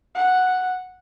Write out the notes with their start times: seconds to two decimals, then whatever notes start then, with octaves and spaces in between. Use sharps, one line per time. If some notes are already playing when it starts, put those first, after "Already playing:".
0.15 F#5